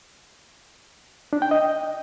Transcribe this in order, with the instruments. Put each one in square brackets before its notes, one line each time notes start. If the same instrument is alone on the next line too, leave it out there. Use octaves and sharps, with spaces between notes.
[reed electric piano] D4
G5
D#5